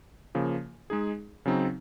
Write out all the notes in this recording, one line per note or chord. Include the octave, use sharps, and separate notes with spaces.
C#3 F3 A#3
G#3 D#4 G#4
C#3 F#3 C4 D#4